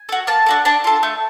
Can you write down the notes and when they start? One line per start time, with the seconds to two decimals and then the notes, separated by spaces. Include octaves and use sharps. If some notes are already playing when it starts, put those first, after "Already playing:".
Already playing: G#5
0.09 F#4 A4
0.27 A#3 A5
0.46 D4 F#4 A4
0.65 D4 A5
0.84 F4 A4
1.03 A3